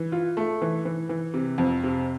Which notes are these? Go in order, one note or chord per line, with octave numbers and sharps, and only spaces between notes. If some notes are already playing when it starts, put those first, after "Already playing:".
Already playing: E3
F4
A3
E3
E3
E3
C3
F2
C3